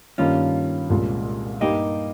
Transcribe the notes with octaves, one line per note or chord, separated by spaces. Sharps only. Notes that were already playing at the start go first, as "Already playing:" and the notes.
G2 D#3 A#3 C#4 F4
C2 A#2 G#3
G2 G3 A#3 D#4 G4